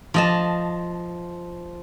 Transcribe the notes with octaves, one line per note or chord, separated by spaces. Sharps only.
F3 D#5 A5